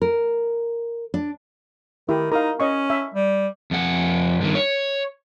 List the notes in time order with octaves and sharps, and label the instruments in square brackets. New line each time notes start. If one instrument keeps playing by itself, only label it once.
[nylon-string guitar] A#4
D4
[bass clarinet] D#3 [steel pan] E4 G4
[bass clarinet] D#4 [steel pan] A#4 F5
[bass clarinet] C#4 [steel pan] C#5 D#5 C#6
[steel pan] E5
[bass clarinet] G3
[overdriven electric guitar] F2 F#5
G2 D#3
C#5